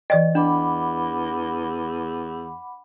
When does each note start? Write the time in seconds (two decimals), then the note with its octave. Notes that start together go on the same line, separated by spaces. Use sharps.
0.10 E3 D5 D#5 G5
0.35 E2 D4 F#5 B5 D6